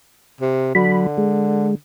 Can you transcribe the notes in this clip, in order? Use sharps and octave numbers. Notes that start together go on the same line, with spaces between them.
C3
D3 F#3 B5
G#3